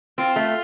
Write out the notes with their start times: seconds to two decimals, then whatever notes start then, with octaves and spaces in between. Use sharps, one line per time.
0.18 C4 F4
0.36 A3